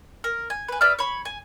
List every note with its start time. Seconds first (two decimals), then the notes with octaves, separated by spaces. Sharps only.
0.24 A#4
0.50 G#5
0.68 B4 G#5
0.81 B4 D5 E5 F6
0.99 C#5 B5
1.25 G#5